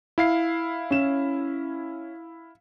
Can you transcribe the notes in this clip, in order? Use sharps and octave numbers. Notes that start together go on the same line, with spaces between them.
E4 F5 C7
C#4 E7